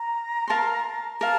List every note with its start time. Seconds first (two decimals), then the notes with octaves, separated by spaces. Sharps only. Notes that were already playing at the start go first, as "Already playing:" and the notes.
Already playing: A#5
0.48 A#4 F5 A5 C6
1.21 A#4 F5 A5